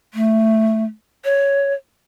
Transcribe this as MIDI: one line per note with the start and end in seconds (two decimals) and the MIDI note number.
0.14 0.84 57
1.25 1.74 73